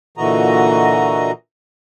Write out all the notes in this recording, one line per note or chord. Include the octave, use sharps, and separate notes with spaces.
A#2 D3 E3 F#4 D#5 A#5